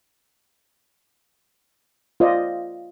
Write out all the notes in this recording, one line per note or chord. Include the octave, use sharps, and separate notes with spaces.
F4 C5 D5 D#5